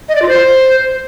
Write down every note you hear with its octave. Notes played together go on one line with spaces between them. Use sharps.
D#5
D5
F4
C5